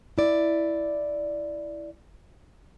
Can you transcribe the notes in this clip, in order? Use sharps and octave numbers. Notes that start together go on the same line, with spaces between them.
E4 D5